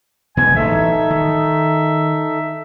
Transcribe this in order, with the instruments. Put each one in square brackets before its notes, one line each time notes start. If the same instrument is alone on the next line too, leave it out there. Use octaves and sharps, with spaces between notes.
[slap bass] B2 D3 G#3 [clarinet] G#5
[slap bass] A1 [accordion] D#4 A4 [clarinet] E5
[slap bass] D#3